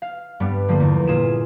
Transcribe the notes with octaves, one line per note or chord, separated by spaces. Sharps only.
F5
G2 G3 B3
D3 F3 A3 A#3
E2
A#2 F4 G#4 E7